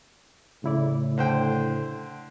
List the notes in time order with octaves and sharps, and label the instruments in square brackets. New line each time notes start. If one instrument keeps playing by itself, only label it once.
[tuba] A2 [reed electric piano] C#3 E4 D5
[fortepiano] D3 C5 G5